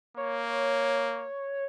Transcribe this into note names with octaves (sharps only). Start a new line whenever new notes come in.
A#3 C#5